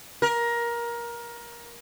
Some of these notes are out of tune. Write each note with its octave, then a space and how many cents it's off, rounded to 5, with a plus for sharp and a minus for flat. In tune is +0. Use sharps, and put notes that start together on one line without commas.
A#4 +20